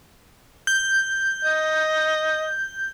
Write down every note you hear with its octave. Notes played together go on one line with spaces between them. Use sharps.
G6
D#5